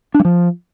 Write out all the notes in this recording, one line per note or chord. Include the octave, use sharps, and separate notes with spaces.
D4
G3
F3